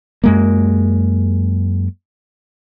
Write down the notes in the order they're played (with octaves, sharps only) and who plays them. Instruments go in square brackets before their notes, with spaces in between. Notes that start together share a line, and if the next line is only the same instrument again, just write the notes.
[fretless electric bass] F#2 G#3 A#3